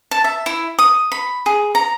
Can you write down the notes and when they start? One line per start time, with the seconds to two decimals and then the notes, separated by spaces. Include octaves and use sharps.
0.11 A5
0.24 E5
0.46 E4
0.79 D#6
1.12 B5
1.46 G#4
1.75 A#5